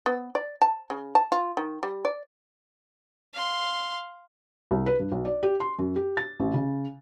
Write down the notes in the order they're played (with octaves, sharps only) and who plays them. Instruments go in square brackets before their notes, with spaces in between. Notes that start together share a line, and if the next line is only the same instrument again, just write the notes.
[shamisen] B3
D5
A5
C#3
A5
F4
D#3
G3
D5
[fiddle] F5 C6
[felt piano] C2
B4
G2
B1
D5
G4
C6
F#2
G4
A6
A1
C#3